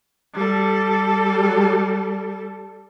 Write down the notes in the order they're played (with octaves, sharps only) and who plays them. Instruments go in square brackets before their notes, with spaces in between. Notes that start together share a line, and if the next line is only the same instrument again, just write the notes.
[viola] G3 A4